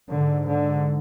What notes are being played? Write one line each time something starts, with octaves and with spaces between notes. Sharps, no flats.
G#2 D3
D3